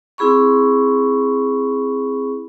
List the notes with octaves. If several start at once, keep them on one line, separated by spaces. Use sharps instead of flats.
C4 E4 G#4 B5 C#6